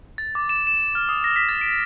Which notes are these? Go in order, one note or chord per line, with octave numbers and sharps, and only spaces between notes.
A6
D6
E7
E7
F6
D#6
A#6
B6
A6
D7